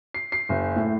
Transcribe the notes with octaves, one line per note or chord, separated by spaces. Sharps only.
C7
C7
F#1
A2